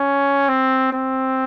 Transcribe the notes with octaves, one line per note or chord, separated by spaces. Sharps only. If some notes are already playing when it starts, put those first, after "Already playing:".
Already playing: C#4
C4
C4